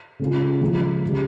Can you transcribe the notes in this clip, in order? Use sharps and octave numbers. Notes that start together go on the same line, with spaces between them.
C#3 G#3 C#4 F4
C#2 C#3 F3 G#3
C#3 G3